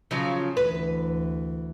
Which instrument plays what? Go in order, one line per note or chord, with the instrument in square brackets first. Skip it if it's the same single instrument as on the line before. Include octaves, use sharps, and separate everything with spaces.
[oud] C#3 F3 F#3
[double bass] D2 E3 [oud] B4